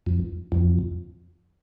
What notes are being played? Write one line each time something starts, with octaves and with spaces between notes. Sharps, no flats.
F2
F2